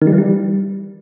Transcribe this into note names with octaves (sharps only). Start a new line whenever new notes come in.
D#3
G3
E3
G3